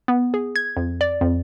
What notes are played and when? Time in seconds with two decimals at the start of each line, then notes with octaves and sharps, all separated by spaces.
0.08 B3
0.34 G#4
0.56 G#6
0.77 F2
1.01 D5
1.21 F2